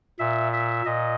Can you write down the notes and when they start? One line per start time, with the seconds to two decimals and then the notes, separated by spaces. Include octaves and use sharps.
0.19 A#2 E5
0.53 E5
0.86 A#2 D#5